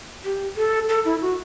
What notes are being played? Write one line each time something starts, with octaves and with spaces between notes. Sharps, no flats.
G4
A4
A4
E4
F#4